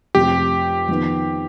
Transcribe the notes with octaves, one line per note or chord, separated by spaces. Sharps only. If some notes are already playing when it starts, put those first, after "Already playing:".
F1 F2 C3 G4
F2 D#3 B3